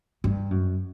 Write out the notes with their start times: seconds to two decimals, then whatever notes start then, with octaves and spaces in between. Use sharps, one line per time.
0.24 G2
0.51 F#2